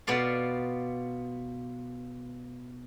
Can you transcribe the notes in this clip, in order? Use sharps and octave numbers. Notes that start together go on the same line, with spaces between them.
B2 B3 F4 D5 F5